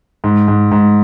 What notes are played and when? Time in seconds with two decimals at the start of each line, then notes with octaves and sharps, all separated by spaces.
0.24 G#2
0.48 G#2
0.72 G#2